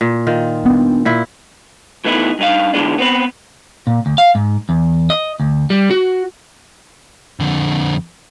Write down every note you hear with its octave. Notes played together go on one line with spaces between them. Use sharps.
A#2
D#3 F4
B3 D4
A#2 E4
A2 E3 B3 D#4 E4
G2 D#4 F5
D3 E3 F#3 G#3 B3 D4
B3 C4 B4
A#2
D2
F5
G#2
E2
D#5
D2
G3
F#4
F2 D3